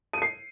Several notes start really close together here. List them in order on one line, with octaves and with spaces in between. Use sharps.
D#7 C#7 C7